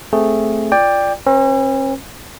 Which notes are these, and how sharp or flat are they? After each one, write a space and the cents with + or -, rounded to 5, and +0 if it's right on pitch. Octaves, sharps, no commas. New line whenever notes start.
A3 +0 C4 +0 G#4 +0
F4 +0 D5 +0 G5 +15
C#4 -45 B4 +0